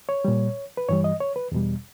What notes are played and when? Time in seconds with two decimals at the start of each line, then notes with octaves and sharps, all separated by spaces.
0.09 C#5
0.25 A#2 G3
0.77 B4
0.89 G2 E3 G3 C#5
1.04 D#5
1.20 C#5
1.36 B4
1.52 E2 B2 G3